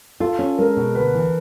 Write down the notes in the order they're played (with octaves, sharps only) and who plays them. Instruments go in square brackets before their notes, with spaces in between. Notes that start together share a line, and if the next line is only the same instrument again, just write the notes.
[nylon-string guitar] F4 [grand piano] A4
[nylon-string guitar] C#4
[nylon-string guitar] G#3 [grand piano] A#4
[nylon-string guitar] B2
[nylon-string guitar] D2 [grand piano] B4
[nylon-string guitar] E3